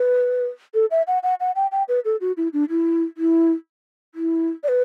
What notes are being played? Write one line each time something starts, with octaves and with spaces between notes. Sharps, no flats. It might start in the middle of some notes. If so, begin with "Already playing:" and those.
Already playing: B4
A4
E5
F#5
F#5
F#5
G5
G5
B4
A4
F#4
E4
D4
E4
E4
E4
D5
B4